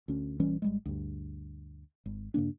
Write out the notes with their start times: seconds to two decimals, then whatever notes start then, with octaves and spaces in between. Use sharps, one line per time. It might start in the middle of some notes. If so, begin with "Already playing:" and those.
0.08 D2 C#4
0.40 A#1 E3 G3 C#4
0.62 G#1 G3 G#3
0.85 D2 G2
2.06 G#1
2.34 G2 C#3 A#3 D4